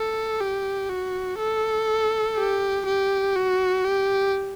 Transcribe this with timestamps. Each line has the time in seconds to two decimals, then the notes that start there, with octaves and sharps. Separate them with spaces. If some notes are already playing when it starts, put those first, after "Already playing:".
Already playing: A4
0.40 G4
0.89 F#4
1.39 A4
2.37 G4
2.86 G4
3.36 F#4
3.84 G4